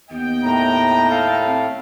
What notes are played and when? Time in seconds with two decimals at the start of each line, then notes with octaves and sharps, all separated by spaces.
0.10 D#2 B3 D#5 G5
0.43 A2 A#5
1.09 A4 F5
1.45 C4